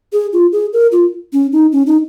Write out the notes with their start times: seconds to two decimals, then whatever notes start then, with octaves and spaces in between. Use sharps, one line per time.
0.13 G#4
0.33 F4
0.52 G#4
0.73 A#4
0.92 F4
1.33 C#4
1.52 D#4
1.72 C#4
1.87 D#4